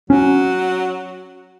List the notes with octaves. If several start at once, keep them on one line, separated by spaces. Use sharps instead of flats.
F#3 C#4